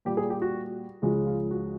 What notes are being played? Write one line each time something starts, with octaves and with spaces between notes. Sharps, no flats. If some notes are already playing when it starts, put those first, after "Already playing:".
A#2 G3 G4
G#4
G4
F#4
C#2 C#3 F3 G#3 F#4
F4
F#4